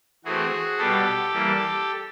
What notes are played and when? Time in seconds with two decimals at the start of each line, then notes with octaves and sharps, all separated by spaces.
0.25 E3 A3 C4 F#4 G#4
0.79 B2 G3 B3 G4 A4
1.33 E3 G3 A#3